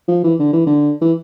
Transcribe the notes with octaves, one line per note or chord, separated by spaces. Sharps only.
F3
E3
D3
E3
D3
E3